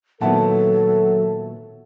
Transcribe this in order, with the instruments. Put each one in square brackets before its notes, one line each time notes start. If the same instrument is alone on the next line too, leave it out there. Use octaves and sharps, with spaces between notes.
[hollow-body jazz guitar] A#2 D#3 B3 [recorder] F#3 [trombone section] A4 [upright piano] E5 F#5 A5